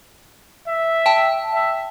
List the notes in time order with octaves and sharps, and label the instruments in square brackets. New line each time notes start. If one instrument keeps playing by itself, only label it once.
[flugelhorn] E5
[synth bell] G5 A5
[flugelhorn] E5